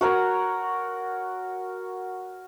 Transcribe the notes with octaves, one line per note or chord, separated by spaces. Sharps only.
F#4 A#4 C#5 F#5